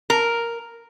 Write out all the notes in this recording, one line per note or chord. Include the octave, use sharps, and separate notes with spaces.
A#4